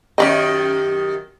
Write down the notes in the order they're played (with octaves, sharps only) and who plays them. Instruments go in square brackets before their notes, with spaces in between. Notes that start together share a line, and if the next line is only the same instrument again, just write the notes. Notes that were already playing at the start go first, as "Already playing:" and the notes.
[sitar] F#2 D#3 G4 [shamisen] C#4 D5 D#5